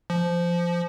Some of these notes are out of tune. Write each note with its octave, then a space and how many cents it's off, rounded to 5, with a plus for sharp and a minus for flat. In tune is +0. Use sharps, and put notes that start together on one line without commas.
F3 -15